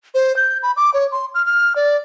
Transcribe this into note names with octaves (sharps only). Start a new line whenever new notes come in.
C5
G6
B5
D6
C#5
C6
F6
F6
D5